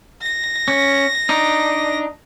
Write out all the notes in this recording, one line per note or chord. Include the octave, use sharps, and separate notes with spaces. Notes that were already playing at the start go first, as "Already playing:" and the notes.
A#6
C#4
D4 D#4